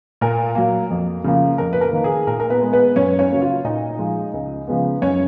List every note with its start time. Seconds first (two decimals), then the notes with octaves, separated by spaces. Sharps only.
0.21 A#2 A#4
0.55 F#3 A#3
0.90 F2
1.24 C#3 F3 A#3
1.58 F2 A#4
1.73 B4
1.81 A#4
1.93 D#3 A#3
2.04 G#4
2.27 A#2 A#4
2.40 A#4
2.50 B3 B4
2.61 G#3 B3
2.73 B3 B4
2.96 F#2 C#4 C#5
3.19 C#4 C#5
3.30 C#3 F#3 A#3
3.42 F4 F5
3.64 A#2 D#4 D#5
3.99 F3 G#3
4.34 C#2
4.68 C#3 F3 G#3 B3
5.01 F#2 C#4 C#5